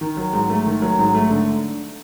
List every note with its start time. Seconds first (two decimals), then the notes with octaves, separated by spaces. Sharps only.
0.01 D#3
0.17 F#3
0.33 G#2
0.50 A3
0.66 D#3
0.82 F#3
0.99 G#2
1.15 A3
1.31 D3